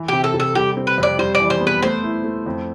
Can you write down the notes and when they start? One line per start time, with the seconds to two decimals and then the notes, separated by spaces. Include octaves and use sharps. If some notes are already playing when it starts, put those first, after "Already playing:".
Already playing: E3
0.08 C3 G4
0.24 A4
0.34 C3
0.40 A4
0.55 G3 G4
0.77 C4
0.87 B4
0.98 F2 D5
1.19 G3 C5
1.35 D5
1.40 E3
1.50 C5
1.61 B3
1.67 B4
1.83 A3 C5
2.04 E4
2.24 A3
2.46 F2